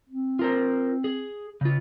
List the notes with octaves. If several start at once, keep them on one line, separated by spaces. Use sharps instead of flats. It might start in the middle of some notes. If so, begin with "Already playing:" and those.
C4
F4 A#4 C5
G#4
C#3 F4